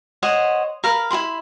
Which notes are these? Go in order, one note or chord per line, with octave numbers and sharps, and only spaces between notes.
C5 C#5 D#5 F#5
A#4 F5 B5
E4 F#4 B5 C6